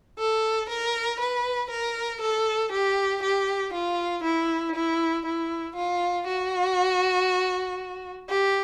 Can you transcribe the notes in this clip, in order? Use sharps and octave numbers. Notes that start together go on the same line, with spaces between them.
A4
A#4
B4
A#4
A4
G4
G4
F4
E4
E4
E4
F4
F#4
G4